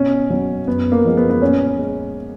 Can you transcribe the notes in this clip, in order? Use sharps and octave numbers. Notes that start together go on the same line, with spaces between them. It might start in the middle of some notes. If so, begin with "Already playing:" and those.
Already playing: B2 C#4
F#3
F#2 B3
A#3
F3 G#3
B3
B3
A#2 C#4
G#3